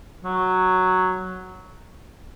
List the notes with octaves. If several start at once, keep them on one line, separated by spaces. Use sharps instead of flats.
F#3